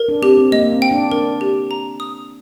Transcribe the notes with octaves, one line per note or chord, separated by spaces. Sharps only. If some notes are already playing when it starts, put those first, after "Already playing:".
Already playing: A#4
D4
C4 G4
C4
A#3 D#5
A#3
C4
G5
D4
D4 A#4
G4
A#5
D#6